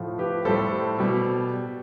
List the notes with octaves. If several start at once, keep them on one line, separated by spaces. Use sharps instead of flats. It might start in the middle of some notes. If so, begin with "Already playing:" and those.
Already playing: A2 F3
G4 B4
A2 G3 A4 C5
B2 G3